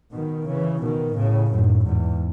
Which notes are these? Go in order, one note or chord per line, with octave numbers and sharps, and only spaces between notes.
B2 D#3
C#3 E3
B2 D#3
A2 C#3
F#2 A2
E2 G#2